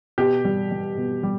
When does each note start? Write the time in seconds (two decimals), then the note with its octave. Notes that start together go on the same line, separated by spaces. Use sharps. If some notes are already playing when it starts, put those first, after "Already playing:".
0.18 B2 G4
0.45 G3
0.71 G3
0.97 B2
1.23 G3